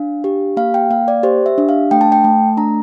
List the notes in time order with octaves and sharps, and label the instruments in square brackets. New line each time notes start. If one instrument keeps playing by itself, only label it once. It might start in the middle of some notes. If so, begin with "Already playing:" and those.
Already playing: [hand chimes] D4 F5
G4
A#3 F5
G5
A#3 F5
D5
G4 C5
E5
D4
F5
A3 G5
A5
G5
A3 A5
D4 A#5